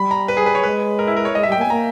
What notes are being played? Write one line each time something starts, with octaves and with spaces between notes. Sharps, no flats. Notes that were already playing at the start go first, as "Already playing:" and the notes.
Already playing: G3 B5
A#5
B4
G#4
B4
C#5
G#3 B4
A#4
E4
A#4
C#5
G#3 D#5
E5
G3
G5
A#3
G#5
B3
A#3 A#5